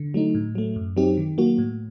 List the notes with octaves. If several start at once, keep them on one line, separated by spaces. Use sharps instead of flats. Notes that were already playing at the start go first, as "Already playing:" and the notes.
Already playing: D3
F#3 A3 D#4
A2
F#3 A3
F#2
F#3 C4 D#4 G4
D#3
F#3 A#3 F#4
A2